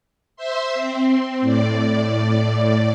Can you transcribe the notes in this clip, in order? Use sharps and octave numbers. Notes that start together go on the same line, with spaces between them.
C5 E5 C6
C4
A2 D5